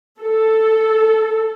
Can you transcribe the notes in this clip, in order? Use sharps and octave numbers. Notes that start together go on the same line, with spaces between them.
A4